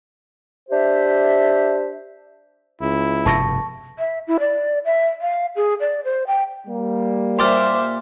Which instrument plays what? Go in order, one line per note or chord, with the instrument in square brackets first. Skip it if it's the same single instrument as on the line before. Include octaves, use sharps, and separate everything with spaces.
[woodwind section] D4 G4 C5 E5
[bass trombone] C#2 [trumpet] E4
[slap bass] F1 G2 B2 [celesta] A5 C#6 A#6
[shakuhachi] E5
E4
D5
E5
F5
G#4
D5
C5
G5
[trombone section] G3 A#3
[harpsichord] A#2 G4 D5 [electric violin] C5 E5 [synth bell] C6 D6 F6